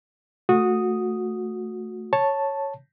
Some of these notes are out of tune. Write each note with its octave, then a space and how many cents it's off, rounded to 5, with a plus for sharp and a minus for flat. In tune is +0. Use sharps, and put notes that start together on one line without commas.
A3 +0 F#4 -20 D#6 +0
C#5 -5 A5 +0